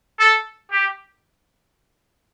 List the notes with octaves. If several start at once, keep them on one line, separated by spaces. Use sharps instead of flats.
A4
G4